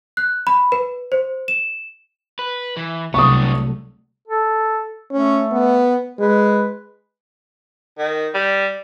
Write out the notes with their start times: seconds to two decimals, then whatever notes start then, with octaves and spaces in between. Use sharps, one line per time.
0.17 F#6
0.47 B5
0.72 B4
1.12 C5
1.48 E7
2.39 B4
2.77 E3
3.14 C2 F#3 A3 B3 D4 C#6 D#6
4.28 A4
5.12 A3 C#4
5.52 B3
6.19 G#3 B4
7.98 D#3
8.34 G3